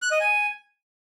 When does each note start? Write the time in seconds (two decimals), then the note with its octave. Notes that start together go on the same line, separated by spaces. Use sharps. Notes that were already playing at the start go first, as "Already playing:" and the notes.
0.02 F#6
0.11 D#5
0.20 G#5